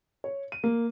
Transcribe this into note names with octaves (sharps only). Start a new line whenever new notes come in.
C#5
D#7
A#3